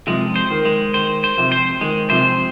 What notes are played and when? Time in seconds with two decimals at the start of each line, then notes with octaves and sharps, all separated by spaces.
0.07 C3 F3 G#3
0.36 C5
0.50 D#3
0.65 G#3
0.94 D#3 C5
1.24 C5
1.37 C3 F3
1.52 C5
1.81 D#3 G#3
2.10 C3 F3 C5